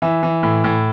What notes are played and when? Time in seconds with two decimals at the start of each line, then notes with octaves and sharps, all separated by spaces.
0.02 E3 E5
0.23 E3
0.43 A2
0.64 A2